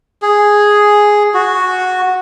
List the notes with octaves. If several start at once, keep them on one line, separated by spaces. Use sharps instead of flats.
G#4
F#4